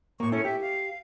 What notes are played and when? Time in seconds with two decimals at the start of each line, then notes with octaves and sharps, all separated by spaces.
0.20 A2 A#3 C#6
0.32 C#4 E4 A4 C#5
0.45 G4 E5
0.61 F5